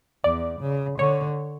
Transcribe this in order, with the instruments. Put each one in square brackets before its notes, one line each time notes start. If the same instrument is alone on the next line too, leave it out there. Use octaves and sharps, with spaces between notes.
[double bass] E2 [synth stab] D5
[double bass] C#3
[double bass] D3 [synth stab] C#5